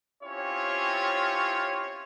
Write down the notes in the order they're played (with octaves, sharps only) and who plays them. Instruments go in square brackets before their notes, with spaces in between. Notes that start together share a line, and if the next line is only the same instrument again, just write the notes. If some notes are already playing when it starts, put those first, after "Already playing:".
[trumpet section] C4 C#4 E4 F4 G4 C#5